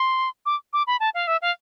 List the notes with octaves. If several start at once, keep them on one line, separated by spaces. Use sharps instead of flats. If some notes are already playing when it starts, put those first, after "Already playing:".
Already playing: C6
D6
D6
B5
A5
F5
E5
F5